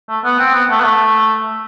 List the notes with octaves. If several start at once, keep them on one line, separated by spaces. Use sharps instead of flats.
A3
B3
C4
B3
A3
B3
A3